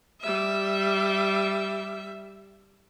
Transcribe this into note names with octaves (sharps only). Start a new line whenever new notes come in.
G3 E5